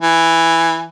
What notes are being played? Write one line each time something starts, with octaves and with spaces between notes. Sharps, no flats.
E3